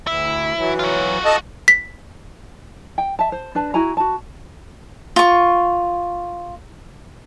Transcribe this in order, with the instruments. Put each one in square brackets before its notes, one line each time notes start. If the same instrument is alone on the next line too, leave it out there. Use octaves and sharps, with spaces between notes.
[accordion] D2 [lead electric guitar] E4
[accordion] E3 F#3
[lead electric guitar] F4 F#4
[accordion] A4 D#5 A5
[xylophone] B6
[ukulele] G5
E5 A5
C5
D4 B4 A5
E4 F#4 G#5 A#5
F#4 A5
[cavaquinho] F4 C#6